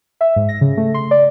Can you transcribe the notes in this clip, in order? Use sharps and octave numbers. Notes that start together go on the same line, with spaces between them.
E5
G#2
A#6
C#3
A3
C6
D5